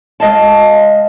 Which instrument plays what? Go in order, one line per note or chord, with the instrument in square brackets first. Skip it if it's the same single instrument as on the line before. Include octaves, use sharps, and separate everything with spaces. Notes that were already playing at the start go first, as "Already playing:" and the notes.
[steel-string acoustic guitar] G#3 D#5 F5 A5